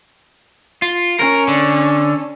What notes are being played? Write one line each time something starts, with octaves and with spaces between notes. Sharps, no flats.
F4
C#4 A#4
D3